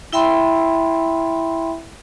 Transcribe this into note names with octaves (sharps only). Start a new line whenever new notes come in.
E4 E5 G5 B5 C6